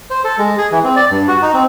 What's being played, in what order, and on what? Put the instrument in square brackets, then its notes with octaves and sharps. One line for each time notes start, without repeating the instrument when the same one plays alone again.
[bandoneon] C5
A4
G#3
G#4
E3
C4
D5
G2
F#4
D#4
C4